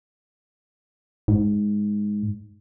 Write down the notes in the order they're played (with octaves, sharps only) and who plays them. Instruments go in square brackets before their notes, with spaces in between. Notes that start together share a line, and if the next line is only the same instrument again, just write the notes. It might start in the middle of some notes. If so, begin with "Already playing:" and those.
[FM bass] G#2